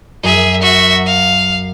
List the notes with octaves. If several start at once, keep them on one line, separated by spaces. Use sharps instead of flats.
F#2 G#4 E5
F#4 E5
F5